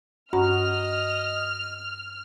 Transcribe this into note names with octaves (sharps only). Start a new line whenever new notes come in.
G2 C#4 F#4 D#5 A#5 F6